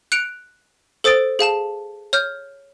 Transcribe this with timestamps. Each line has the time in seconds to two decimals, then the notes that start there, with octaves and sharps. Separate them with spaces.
0.12 F#6 C#7 D7 F7
1.04 A4 C5 D#6 A6 D7
1.39 G#4 F5 A5 E7
2.13 C#5 F6 G6